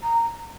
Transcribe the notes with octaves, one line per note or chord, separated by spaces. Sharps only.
A#5